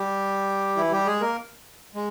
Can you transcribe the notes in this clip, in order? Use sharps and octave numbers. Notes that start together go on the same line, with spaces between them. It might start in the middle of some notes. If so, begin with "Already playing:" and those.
Already playing: G3 G4
E3 E4
G3 G4
G#3 G#4
A#3 A#4
G#3